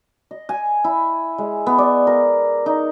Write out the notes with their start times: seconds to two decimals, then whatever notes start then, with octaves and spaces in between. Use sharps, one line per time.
0.31 D#5
0.49 G#5
0.84 E4
1.38 G#3
1.66 B3
1.78 D5
2.07 A#4
2.66 D#4